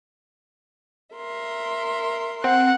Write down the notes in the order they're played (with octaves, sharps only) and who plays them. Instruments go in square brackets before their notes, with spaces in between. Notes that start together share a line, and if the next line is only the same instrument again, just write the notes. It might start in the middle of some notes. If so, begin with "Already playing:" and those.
[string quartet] A#4 E5 C6
[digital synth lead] C4 [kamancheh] F#5